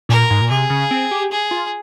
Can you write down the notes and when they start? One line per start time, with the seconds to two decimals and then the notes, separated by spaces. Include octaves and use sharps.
0.09 A#2 A#4
0.30 G#2
0.41 A#2
0.50 C3 G#4
0.70 C#3
0.91 C4
1.11 G4
1.31 G#4
1.51 F4